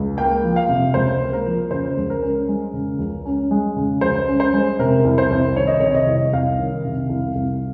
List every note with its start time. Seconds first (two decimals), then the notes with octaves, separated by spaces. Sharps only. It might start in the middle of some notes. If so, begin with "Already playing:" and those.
Already playing: C#2
0.17 A#3 G5
0.43 F3
0.56 F5
0.68 C3
0.94 C#2 C5
1.19 A#3
1.33 A#4
1.45 F3
1.71 C#3 C5
1.97 C#2
2.10 A#4
2.22 C#4
2.48 G#3
2.73 C#3
2.99 C#2
3.25 C#4
3.51 G#3
3.76 C#3
4.01 C#2 C5
4.28 C#4
4.40 C5
4.53 G#3
4.79 C3 A#4
5.04 C2
5.18 C5
5.31 C2
5.56 D#3 C#5
5.67 D#5
5.80 C3 C#5
5.95 D#5
6.07 C2
6.33 C2 F5
6.58 D#3
6.85 C3
7.09 C2
7.35 C2